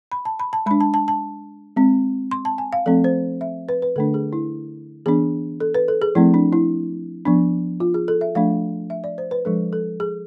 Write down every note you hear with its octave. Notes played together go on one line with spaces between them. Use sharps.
B5
A5
B5
A5
G#3 D4 B5
A5
A5
A5
G#3 C4
C6
A5
G#5
F5
F3 A3 C4 A4
C5
E5
B4
B4
D3 A3 D4 A4
G#4
E4
E3 B3 D4 G#4
A4
B4
A4
G#4
F3 A3 C4 E4
D4
E4
F3 B3 D4
F4
G#4
A4
E5
F3 A3 D4 F5
E5
D5
C5
B4
F3 G#3 D4 A4
A4
G#4